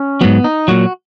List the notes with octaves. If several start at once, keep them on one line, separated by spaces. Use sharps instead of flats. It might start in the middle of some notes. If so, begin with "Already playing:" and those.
Already playing: C#4
G#2 F#3 B3
D#4
A#2 F#3 F#4